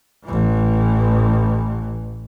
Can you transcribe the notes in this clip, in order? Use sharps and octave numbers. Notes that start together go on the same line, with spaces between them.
A1 E3